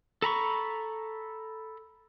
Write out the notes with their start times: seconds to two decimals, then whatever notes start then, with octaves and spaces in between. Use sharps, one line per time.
0.22 A4 A#5 B5 C#6